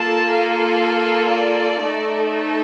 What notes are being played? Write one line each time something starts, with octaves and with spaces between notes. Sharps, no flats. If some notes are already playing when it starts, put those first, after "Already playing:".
Already playing: A#3 F4 A4 A5
F5
D5
A3 D#4 A4
C5